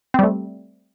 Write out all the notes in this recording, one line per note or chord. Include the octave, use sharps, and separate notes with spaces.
G3 A3 C4